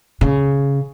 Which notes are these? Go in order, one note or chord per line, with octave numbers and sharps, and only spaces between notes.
C#3